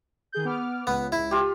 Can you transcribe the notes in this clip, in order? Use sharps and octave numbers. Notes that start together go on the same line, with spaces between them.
D#3 G#4 G6
B3 D6 F6
C#2 B3
E4
F4 G4